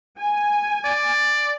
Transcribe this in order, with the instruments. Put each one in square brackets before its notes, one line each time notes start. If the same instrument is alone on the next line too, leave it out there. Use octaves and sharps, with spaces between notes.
[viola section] G#5
[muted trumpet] D5